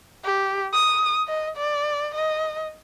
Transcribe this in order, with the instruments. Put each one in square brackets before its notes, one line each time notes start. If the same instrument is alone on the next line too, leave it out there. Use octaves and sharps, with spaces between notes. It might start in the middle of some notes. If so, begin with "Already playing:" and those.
[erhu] G4
D#6
D#5
D5
D#5